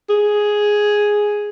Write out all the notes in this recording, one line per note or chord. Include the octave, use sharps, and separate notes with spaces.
G#4